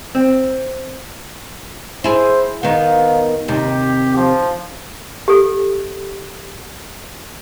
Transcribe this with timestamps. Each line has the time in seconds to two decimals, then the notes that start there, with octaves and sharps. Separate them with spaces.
0.15 C4
2.04 E4 G#4 C5
2.63 D#3 B3 F5
3.48 D#2 C3 G4
4.16 F3
5.28 G4 A4